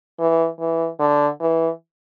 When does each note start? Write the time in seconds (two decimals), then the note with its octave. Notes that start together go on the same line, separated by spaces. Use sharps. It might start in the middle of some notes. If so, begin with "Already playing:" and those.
0.19 E3
0.60 E3
0.99 D3
1.41 E3